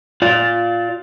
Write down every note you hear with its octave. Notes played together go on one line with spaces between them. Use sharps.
F4 D5